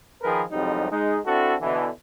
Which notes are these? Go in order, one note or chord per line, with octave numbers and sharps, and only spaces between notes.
D#3 F3 G#4 A#4 B4
C2 F2 G#2 F#3 G3 D#4
G#3 D#4
C4 D4 E4 F#4 A4
B2 D3 E3